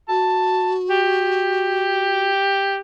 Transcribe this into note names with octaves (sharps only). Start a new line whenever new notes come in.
F#4 A5
G4